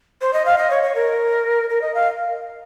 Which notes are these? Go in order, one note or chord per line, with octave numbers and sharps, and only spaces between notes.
C5
D#5
F5
D#5
C#5
C#5
A#4
A#4
D#5
F5